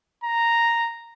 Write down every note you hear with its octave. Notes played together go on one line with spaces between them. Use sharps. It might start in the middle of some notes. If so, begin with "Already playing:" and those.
A#5